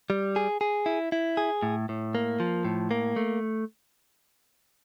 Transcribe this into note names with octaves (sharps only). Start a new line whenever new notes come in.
G3
G#4
G#4
E4
E4
G#4
A2
A2
A#3
F3
A2
A#3
A3